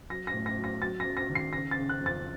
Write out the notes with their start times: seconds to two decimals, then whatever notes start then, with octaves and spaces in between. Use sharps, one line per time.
0.10 F#3 A#6
0.27 A#6
0.34 A2
0.46 A#6
0.58 F#3
0.64 A#6
0.81 F#3 A6
1.00 A#6
1.05 F#3
1.17 A#6
1.30 D#3
1.35 C7
1.53 C#3 A#6
1.71 A6
1.77 C#3
1.89 F#6
2.01 F2
2.06 A6